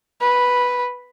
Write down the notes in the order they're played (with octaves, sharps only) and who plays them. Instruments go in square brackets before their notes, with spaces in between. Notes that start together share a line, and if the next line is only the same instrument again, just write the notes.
[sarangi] B4